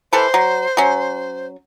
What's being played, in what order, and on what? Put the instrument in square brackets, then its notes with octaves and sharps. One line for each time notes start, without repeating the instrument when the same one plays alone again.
[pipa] E3 A4 B4 [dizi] C5
[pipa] F#3
F#3 C#4